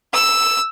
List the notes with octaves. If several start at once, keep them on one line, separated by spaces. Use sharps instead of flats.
E6